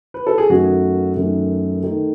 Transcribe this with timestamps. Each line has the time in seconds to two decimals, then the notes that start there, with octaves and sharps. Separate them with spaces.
0.14 B4
0.27 A4
0.38 G#4
0.49 F#2 D#3 A3 F#4
1.16 F#2 D#3 A3
1.83 D#3 A3 D#4